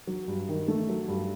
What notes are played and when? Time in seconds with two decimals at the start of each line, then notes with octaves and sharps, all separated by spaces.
0.07 F#3
0.28 G2
0.49 D#3
0.68 A3
0.89 F#3
1.08 G2